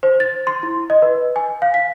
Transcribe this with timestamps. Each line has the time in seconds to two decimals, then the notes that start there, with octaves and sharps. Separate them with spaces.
0.03 C5
0.20 A6
0.47 C6
0.63 E4
0.90 D#5
1.02 B4
1.36 G#5
1.62 F5
1.74 B6